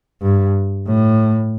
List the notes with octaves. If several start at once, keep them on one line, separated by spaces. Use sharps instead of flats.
G2
A2